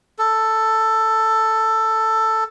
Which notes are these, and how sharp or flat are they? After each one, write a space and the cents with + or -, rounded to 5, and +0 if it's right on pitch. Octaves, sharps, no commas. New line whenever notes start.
A4 +10